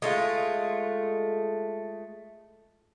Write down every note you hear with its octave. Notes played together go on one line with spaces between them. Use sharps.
G#3 A3 E4 F4